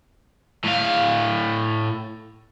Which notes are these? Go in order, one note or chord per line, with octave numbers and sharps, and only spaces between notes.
A2 F5